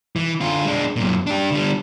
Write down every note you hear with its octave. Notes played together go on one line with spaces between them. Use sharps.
E3
D3 F4
G#3 D4
F#2 A#2
D4 G4
D3 G3